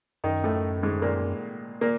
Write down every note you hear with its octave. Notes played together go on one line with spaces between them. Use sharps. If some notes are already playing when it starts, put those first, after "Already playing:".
F#2 D#3 D#4
A2 A3
G#2 G#3
A#2 A#3
A#2 A#3